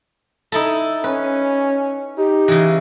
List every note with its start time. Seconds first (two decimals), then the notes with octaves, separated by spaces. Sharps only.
0.52 D#4 E4 A4
1.04 C#4 B4
2.18 D#4 G4
2.48 C#3 E3